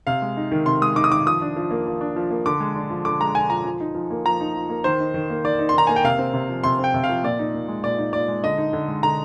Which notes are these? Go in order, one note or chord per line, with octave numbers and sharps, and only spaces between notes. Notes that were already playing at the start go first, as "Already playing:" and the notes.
C3 F5
G#3
D#4
D#3
C3 C6
G#3 D#6
D#4 D6
D#6
D#3 D6
F3 D#6
D4
F3
A#3
F3
D4
F3
A#3
D3 D6
G#3
D4
F3
D3 D6
G#3 A#5
D4 G#5
F3 A#5
F3
D#4
F3
A#3
F3 A#5
D#4
F3
A#3
D#3 C5
D#4
D#3
A#3
D#3 D5
D#4
C6
D#3 A#5
A#3 G#5
G5
C3 F5
C4
C3
F3
C3 C6
C4
G5
C3
F5
F3
A#2 D5
D#4
A#2
G#3
A#2 D5
D#4
A#2 D5
G#3
D3 D#5
D#4
D3
G#3
D3 A#5